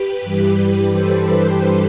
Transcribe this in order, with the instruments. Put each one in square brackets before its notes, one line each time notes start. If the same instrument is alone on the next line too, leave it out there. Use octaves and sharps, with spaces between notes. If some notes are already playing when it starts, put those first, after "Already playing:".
Already playing: [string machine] G4 B4
G2 E3 G3
A4 C5